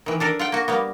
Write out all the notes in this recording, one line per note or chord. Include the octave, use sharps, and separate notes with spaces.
D#3 E3
D4 A4 A#4
F4 F#5 G5
A#3 F#4
G3 A#3 B3